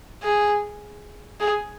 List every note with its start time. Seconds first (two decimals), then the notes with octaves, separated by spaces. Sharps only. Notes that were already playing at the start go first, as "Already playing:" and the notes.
0.22 G#4
1.40 G#4